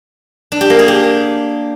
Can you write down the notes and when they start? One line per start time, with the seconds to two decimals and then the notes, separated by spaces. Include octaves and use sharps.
0.52 D4
0.61 G4
0.70 A#3
0.79 G#4
0.88 G4